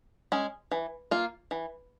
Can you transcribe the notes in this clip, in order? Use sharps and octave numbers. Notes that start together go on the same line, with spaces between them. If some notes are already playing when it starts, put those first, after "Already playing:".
G#3 C#4
E3
A#3 F4
E3